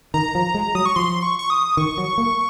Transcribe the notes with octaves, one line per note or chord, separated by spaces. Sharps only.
D#3 A#5
F3
G#3
F#3 D#6
C#6
F3 C6
C#6
C#6
D#6
D#3 C#6
F#3
A#3